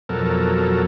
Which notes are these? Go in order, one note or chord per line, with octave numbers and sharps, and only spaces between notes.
F2 B2 F#3 A4 A#4